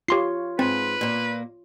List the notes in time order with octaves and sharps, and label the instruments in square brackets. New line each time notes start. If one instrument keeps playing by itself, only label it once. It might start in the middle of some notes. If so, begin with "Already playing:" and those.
[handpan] F4 C#5 [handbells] G4 C6 C7
[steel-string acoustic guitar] G#2 [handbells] C4 [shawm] B4
[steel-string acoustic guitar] A#2 A#3